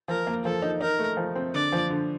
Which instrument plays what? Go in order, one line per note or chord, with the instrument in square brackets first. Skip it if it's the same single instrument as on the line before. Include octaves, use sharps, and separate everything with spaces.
[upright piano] F3 [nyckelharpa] A#4
[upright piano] A#3
[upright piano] F3 [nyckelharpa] A4
[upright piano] D#4
[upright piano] D#4 [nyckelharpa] A#4
[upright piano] A3
F3
C4
[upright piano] D3 [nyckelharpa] D5
[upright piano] F3
D3